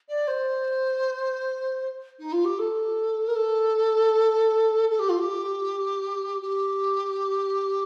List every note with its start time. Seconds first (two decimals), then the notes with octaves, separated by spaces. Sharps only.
0.08 D5
0.27 C5
2.19 D#4
2.32 F4
2.44 G4
2.58 A4
3.27 A#4
3.35 A4
4.89 A4
4.99 G4
5.09 F4
5.18 G4
6.41 G4